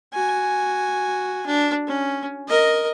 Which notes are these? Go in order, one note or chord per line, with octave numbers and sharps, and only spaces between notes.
F#4 G#5
D4
C#4
A#4 D#5